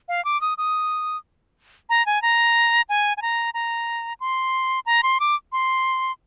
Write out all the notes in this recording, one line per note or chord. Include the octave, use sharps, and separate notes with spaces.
F5
D6
D#6
D#6
A#5
G#5
A#5
G#5
G#5
A#5
A#5
C6
A#5
C6
D6
C6